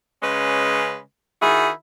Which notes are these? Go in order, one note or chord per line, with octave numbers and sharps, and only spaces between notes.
C#3 G#3 C#4 B4
D#3 E4 F#4 G#4